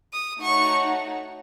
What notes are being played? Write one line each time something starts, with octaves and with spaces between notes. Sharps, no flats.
D#6
A3 D#4 F#4 C#5 F#5 C#6